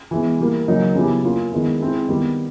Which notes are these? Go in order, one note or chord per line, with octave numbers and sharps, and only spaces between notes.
E3 G#3 B3
E3 G3 A#3
C#3 F#3 A#3 D#4
C#3 F#3 B3 E4 G4
A#3 C#4 F4
D#3 G#3 B3 E4
G#3 C4 E4 A4
D#3 G3 B3